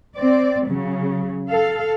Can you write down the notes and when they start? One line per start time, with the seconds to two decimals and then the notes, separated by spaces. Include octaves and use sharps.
0.16 C4 D5
0.69 C#3 F#3
1.50 A4 F5